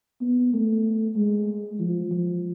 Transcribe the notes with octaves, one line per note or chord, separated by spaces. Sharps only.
B3
A3
G#3
F3
F3